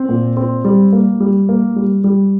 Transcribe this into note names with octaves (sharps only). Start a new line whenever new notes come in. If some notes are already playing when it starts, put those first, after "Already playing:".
Already playing: C4
A#2
C4
G3
A#3
G3
A#3
G3
G3